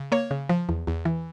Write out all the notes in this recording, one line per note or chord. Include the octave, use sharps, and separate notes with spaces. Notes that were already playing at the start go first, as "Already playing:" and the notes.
Already playing: C#3
A#3 C#5
C#3
F3
E2
E2
E3